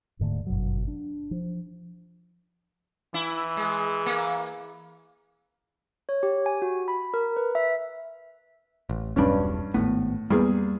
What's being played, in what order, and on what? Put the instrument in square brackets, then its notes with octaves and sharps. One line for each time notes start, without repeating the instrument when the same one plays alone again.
[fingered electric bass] D1 G#2 D3 A3
G1 F#2 B2 F#3
D4
F3
[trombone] E3 [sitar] E4
[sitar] G#3
A#3
[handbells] C#5
G4
G#5
F#4
B5
A#4
B4
E5
[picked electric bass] A1
[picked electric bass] E1 B1 D4 [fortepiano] G2 C#4
[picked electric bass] G#1 D#2 B3 [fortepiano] A2
[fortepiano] E2 G#4 [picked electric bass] G3 A#3